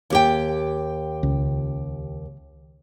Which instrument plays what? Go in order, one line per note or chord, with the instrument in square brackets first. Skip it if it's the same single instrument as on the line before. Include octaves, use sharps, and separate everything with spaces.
[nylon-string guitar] D#2 G4 G5
[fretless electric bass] C#2